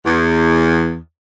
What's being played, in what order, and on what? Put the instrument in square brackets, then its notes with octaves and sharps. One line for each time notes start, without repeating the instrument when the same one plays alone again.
[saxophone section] E2